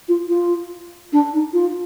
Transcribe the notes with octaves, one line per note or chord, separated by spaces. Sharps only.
F4
F4
D4
D#4
F4